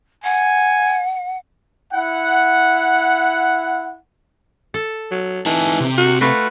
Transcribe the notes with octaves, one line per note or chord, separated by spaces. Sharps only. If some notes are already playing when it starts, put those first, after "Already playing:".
F#5 G#5
E4 F#5
A4
F#3
E3 D#4 G#5 A5
C3 C4
F#4
A3 F4 F#4 B4